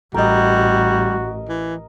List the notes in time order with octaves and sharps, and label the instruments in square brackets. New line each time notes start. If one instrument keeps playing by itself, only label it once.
[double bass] A1 [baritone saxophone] G3 [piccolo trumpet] F#4 [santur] A#4 D#5
[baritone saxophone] E3